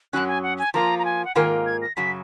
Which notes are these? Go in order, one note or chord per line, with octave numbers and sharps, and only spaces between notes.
F#2 D#3 F#3 C#4 F#6
G#5
F#5
G#5
F3 A#3 F4 A#5
A#5
G#5
F#5
G#2 D#3 A#3 F4 A#4 G#5
G#6
A#6
F#2 C#3 F#3 B6